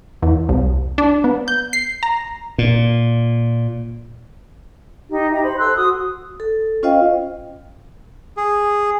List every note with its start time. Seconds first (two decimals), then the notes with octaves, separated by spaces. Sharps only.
0.22 E2
0.49 C2
0.98 D4
1.24 B3
1.48 G6
1.73 C7
2.03 A#5
2.58 A#2
5.09 D#4 G4
5.32 D#4 G4 E5 A#5
5.44 C5 B5
5.58 A4 C6 E6 F#6
5.77 F#4 D#6
6.40 A4
6.83 C#4 F4 C5 D#5 F5 G5
8.37 G#4